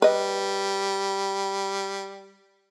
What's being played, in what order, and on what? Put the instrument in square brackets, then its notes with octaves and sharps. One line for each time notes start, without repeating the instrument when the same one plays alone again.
[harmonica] G3 [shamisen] B4 D#5